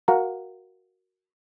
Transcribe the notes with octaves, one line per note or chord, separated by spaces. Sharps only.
F#4 A#4 F5 F#5 A#5